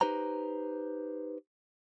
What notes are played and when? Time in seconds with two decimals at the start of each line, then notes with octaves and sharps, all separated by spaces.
0.01 D#4 G4 B4 C5 A#5